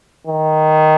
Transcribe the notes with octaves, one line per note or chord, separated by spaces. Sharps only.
D#3